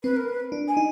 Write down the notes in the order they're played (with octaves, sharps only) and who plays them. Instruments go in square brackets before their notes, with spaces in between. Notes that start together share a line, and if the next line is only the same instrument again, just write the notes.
[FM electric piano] C4 [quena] B4
[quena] A#4
B4
[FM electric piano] D4
[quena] G#5
[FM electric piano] D#4